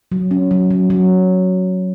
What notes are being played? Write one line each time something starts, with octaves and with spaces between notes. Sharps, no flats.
F#3
C#4
F#3
F#3
F#3